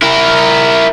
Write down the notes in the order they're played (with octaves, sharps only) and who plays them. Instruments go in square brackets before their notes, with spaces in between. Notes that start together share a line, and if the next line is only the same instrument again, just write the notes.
[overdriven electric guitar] E4 A#4